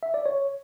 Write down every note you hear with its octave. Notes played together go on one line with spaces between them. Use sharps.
E5
D5
C#5